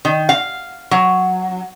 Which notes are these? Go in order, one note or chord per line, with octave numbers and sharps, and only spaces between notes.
D#3
F5
F#3